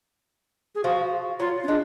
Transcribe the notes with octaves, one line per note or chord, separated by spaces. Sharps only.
G#4
F3 F#4
F#3 F4
C#4
G#3 D4